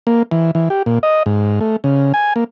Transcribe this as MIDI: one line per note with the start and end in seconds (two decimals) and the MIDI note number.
0.07 0.23 58
0.31 0.51 52
0.55 0.69 52
0.70 0.83 67
0.86 0.99 46
1.03 1.23 75
1.26 1.59 44
1.61 1.76 57
1.84 2.13 49
2.14 2.33 80
2.36 2.44 58